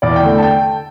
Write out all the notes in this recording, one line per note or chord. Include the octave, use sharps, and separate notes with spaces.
E2 D5
G5
D3 A3 D4
G5
A5
G5